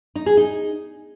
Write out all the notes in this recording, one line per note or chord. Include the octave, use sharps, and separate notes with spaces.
D#4
G#4
D#4